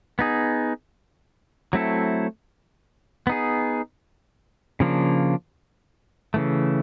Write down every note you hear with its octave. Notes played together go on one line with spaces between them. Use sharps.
B3 D#4 G#4
F#3 A3 C4 E4 A4
B3 D#4 G#4
C#3 F3 A#3 D4
C#3 E3 A3